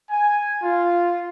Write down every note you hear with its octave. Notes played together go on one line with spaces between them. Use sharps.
G#5
F4